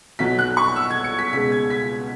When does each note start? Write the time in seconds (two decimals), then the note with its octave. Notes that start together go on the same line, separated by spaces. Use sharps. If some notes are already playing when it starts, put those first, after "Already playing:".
0.19 B1 B2 F#3 B6
0.39 F#6
0.57 C#6
0.76 E6
0.90 G#6
1.04 C#7
1.19 B6
1.33 C#2 B2 G#3 B6
1.52 G#6
1.70 B6